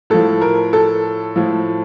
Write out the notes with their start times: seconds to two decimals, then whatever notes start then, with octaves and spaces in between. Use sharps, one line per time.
0.10 A2 F3 A4
0.41 A#4
0.73 A4
1.36 A2 F3